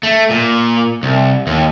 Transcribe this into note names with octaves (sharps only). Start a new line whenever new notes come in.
A3
A#2
C2
D#2